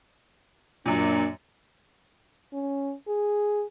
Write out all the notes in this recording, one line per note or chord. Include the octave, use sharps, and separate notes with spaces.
F#2 A#2 A#3 D4
C#4
G#4